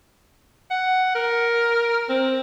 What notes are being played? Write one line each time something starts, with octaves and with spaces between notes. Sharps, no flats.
F#5
A#4
C4